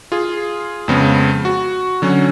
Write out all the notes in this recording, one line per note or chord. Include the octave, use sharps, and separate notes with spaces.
F4 G#4
F2 C#3 G#3 B3
F#4
D3 F#3 C#4